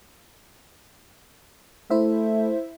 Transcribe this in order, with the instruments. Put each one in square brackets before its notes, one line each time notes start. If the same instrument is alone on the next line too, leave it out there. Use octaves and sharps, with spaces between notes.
[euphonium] A3 [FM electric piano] E4 C5 E5